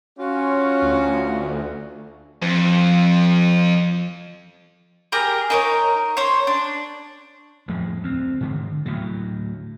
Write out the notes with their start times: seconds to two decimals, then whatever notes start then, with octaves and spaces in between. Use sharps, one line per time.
0.19 C#4 F4 F#4
0.82 D2
2.42 F2 F3
5.12 G4 G#4 A#4 A#5
5.50 D#4 A#4 C#5
6.17 C5 C#5
6.47 D4
7.68 F2 A2 F3 G#3
8.03 D2 C4
8.41 G#2 D3 D#3
8.86 D2 A2 F#3